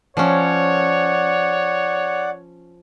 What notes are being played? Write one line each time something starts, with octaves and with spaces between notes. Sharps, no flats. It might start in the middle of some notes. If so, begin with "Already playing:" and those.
F3 C#4 C#5 D5 F#5